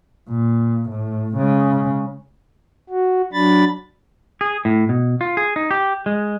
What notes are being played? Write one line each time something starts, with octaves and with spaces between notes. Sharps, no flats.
A#2
A2
C#3 G#3
F#4
F#3 D4 B5 A6
G#4
A2
B2
F4
G#4
D#4
G4
G#3